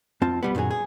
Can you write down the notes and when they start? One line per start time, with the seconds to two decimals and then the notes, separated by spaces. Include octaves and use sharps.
0.22 F2 C4 F4 A5
0.43 B1 G3 B3
0.55 F#2 A#2 D#3 F#3 G#4
0.71 G#4